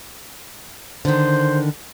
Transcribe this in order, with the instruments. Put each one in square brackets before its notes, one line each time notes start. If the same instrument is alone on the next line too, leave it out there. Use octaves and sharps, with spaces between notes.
[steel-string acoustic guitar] D3 D#3 [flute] C5